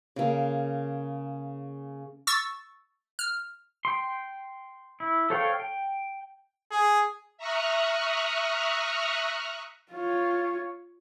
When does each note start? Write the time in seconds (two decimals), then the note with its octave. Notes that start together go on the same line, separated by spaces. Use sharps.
0.16 C#3 A#3
2.27 C#6 E6 A6
3.19 F6
3.85 G5 C6
5.00 E4
5.30 A4 C5 C#5 F5 G5
5.59 G5
6.71 G#4
7.38 E5 A#5 C#6 D#6 F6 F#6
9.92 F4 C#5